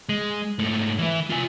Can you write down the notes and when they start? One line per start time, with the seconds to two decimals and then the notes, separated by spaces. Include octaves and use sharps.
0.09 G#3
0.59 G#2 A3
0.98 E3 E4
1.30 F4 G#5